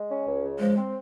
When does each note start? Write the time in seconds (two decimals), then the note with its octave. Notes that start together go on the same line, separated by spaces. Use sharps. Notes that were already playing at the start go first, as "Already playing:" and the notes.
Already playing: G#3
0.10 C#4
0.27 C#2
0.43 C#3
0.59 F3 G#3
0.77 C4